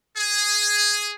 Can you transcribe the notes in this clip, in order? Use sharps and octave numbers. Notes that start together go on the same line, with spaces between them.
G#4